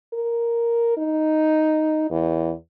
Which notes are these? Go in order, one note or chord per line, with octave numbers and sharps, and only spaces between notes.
A#4
D#4
E2